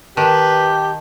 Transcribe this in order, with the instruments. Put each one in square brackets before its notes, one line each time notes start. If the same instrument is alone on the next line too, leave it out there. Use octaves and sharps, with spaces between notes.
[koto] D#3 [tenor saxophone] G4 [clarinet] B4 [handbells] A5